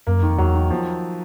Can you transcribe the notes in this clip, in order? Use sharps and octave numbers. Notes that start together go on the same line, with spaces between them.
F#2 A#3
F2 D#3
E2 F#3
D#3
F3